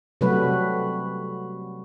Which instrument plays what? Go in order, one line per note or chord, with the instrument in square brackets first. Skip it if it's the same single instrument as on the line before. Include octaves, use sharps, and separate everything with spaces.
[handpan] C3 F#3 G3 A3 F#4 B4